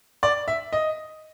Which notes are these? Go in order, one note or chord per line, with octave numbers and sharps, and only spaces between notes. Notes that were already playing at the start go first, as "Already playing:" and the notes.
D5
E5
D#5